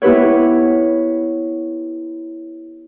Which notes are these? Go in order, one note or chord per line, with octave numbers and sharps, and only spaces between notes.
B3 E4 G4 B4 C#5